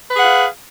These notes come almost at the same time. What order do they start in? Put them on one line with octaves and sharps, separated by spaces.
B4 G#4 F#5 F5